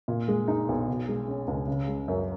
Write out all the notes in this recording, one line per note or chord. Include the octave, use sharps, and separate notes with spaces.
A#2
G#3
D#4
B1
B2
G#3
C#4
C#2
C#3
G#3
F#2